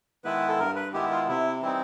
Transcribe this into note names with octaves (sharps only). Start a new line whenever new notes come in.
D#3 G#3 B3 E4 B4
A4
G2 A#4
B4
D#3 G#3 B3 E4 G4
F4
C3 E4
E3 G3 C4 D#4 E4